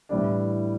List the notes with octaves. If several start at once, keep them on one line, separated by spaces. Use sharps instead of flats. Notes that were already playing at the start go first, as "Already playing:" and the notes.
A2 E3 G3 D4